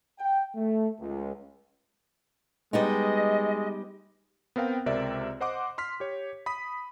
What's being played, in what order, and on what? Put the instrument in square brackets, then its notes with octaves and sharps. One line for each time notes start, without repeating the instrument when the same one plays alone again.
[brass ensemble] G5
A3
C#2
[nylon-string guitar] G3 B3 D#4 [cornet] G#3 [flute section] D#5
[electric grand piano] B3 C4 A#4 F5 G5
C#2 C3 C4 A#4 D5 E5
C5 D#5 F#5 C6 D6
C6 F6 B6
G4 C#5
B5 D#6 B6